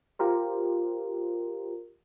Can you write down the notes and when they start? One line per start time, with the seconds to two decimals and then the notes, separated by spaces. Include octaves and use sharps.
0.19 F4 G4 A#4 C5